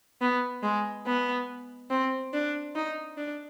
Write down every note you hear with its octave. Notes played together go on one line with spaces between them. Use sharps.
B3
G#3
B3
C4
D4
D#4
D4